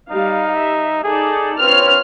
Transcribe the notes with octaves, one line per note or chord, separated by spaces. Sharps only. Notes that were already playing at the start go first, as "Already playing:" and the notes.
G3 D#4 F5
E5
D#4 G#4 A4 D5
C4 F4 B4 C#5 F6